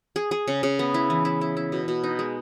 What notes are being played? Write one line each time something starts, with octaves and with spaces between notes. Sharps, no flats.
G#4
G#4
C#3
C#3
B3
E4
E3
E4
E4
E4
B2
B2
D#4
G#3